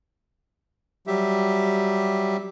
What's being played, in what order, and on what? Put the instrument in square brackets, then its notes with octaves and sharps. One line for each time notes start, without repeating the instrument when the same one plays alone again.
[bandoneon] F#3 G3 G4 E5